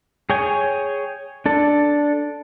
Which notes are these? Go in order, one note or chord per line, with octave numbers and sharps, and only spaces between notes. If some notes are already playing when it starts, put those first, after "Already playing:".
G#4 C#5 G5 G#5
D4 A4